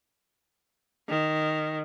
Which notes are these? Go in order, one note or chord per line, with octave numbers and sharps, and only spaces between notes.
D#3